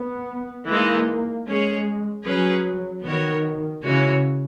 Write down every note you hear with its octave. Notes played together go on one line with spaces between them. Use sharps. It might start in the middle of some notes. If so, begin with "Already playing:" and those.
Already playing: B3
E3 G#3 A#3 D#4
G#3 C#4 G#4 C#5
F#3 C#4 G#4 B4
D#3 B3 F#4 A#4 C#5
C#3 E3 G#3 C#4 F#4 C#5